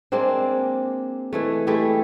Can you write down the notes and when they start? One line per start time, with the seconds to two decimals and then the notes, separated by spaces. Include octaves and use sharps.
0.12 G#3 A#3 C4 D4
1.33 E3 G#3 A3
1.67 G#3 A3 E4 G4